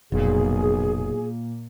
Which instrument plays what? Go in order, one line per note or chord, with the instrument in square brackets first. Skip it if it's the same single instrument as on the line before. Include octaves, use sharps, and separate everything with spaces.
[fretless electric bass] F1 [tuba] B1 [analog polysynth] A#2 A#3 [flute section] G#4